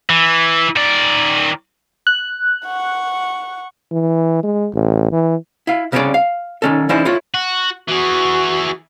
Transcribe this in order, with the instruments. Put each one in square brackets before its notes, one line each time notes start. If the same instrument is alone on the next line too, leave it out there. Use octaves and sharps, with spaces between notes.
[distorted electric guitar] E3
D#3 D5
[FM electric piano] F#6
[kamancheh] F#5 C#6
[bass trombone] E3
G#3
A1
E3
[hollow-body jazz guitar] E4 F5
C2 C#3 B3 C4 C#5 D5
F5
D#3 C#4 A4
E3 C#4 D#4 E4 C5 D5
E4 F4 C#5
[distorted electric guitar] F#4
[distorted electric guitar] E3 G#4 [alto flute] F#4